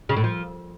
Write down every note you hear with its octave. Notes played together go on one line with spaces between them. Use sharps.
C#3
A2
F3